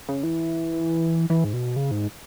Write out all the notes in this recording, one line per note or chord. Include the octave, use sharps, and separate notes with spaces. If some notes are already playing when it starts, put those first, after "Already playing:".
C#3
E3
E3
G#2
B2
C#3
G#2